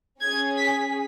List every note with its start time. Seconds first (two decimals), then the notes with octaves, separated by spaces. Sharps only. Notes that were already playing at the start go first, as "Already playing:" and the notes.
0.21 C#4 G#4 G#6
0.58 B6